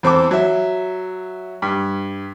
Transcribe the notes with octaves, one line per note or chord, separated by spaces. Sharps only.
E2 C4 A4 D6
F#3 E5
G2